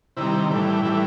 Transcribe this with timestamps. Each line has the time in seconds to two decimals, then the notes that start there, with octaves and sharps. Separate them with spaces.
0.17 C3 D#3 G3 E4
0.50 A2 E3 G3
0.82 A2 E3 G3 E4